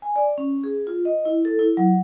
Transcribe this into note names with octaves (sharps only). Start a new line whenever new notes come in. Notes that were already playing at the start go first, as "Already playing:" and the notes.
G#5
D5
C#4
G#4
F4
D#5
E4
A4
E4
F#3